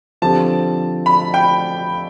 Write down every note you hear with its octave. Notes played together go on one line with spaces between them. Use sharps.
D3 F3 C4 G4 A5
B5
G5